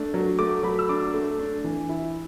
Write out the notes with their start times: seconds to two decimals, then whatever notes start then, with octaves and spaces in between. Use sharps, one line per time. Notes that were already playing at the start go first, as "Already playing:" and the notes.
Already playing: A3 D4
0.14 F#3
0.39 A3 D6
0.63 F#3 B5
0.79 E6
0.89 D4 D6
1.14 A3
1.39 D4
1.64 E3
1.89 E4